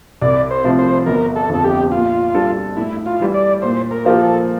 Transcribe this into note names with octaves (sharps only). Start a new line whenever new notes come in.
C2 D5
C5
C3 F3 A3
C5
G1 A#4
A4
F2 D3 F3 A4
G4
A#2 F4
G3 D4 A4
A2 E4
F4
E3 G3
D5
A#2 C5
A#4
F3 A#3 F4 G4 C5
A4